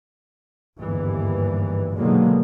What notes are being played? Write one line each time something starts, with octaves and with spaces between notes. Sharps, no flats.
G1 D#2 G#2 E3 G3
B2 D3 D#3 F#3 G#3 A#3